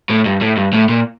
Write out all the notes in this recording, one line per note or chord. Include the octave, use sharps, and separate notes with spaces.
A2
G2
A2
G2
A2
A#2